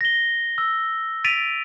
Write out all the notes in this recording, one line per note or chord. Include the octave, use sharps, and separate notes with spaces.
A#6 G7
E6
A6 B6 D7 D#7 F7